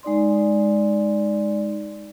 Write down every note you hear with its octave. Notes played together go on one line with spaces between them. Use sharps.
G#3 D#4 D5 C6